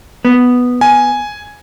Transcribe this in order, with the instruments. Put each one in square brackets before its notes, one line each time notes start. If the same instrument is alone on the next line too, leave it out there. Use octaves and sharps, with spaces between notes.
[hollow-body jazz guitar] B3
[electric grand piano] G#5